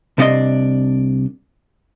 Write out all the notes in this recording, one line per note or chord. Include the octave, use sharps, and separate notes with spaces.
C2 C3 B3 D4 D#5 C6